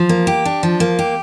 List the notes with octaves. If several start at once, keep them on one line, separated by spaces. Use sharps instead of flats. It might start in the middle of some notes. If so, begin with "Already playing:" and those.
Already playing: F3
A#3
G4
D4
F3
A#3
G4